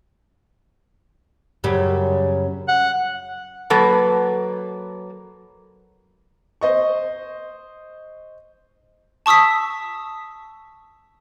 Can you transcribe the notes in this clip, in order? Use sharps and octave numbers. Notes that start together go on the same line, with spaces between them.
F#2 C#3 G3
F#5
F#3 A#3 A4 B4
C5 D#5 C#6
A5 C#6 D#6 E6 B6